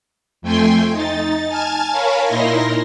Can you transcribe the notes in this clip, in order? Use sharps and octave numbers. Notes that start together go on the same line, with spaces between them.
F2 A3 G5 G#5 C6
D#4 A6
G#5 A5 F6 G#6 A6
A#4 C#5 F5 G#5 A5 B5
A#2 D#4 E4 A#4 C6 A#6